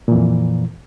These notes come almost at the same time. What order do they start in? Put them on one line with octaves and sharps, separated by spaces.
A#2 E3 F2